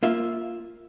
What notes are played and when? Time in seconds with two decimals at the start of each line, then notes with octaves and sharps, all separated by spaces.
0.03 A#3 F4 E5